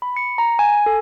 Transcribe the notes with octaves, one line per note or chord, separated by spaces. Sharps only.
B5
C#7
A#5
G#5
A4